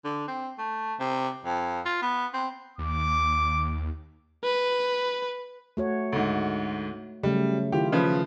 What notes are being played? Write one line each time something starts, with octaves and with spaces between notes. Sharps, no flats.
D3
C4
A3
C3
F2
F4
B3
C4
D#2 D6
B4
A3 F#4 C#5
D2 G#2
C#3 F#3 G3 A3
D#3 E4 F4 G4
C#3 F3 B4